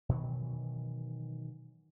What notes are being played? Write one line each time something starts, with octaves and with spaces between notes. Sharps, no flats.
B2 D#3 E3 F#3